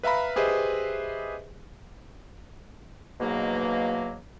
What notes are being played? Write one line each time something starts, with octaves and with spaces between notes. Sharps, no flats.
B4 E5 F5 A#5 B5
G4 G#4 B4 C5 D#5 E5
E2 G#2 B2 F#3 A#3